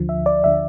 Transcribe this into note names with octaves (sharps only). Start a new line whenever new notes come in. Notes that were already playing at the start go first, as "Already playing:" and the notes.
Already playing: D2 D3 F3
E5
D5
D2 D3 F3 E5